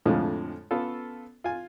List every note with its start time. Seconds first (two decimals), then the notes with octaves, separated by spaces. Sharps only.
0.06 F2 A2 D3 F3 G#3
0.71 B3 C#4 F4 A4
1.44 F4 G#5